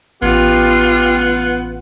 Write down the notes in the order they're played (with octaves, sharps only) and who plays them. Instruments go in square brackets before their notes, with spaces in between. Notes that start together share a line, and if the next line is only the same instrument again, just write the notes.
[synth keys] A1 [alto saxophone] B3 [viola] F4 [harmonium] G4